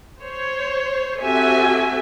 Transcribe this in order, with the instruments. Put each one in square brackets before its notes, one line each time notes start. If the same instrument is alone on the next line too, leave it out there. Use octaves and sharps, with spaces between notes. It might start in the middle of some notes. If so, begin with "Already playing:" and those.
[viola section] C5 C#5
C4 F#4 G4 A4 E5 G#5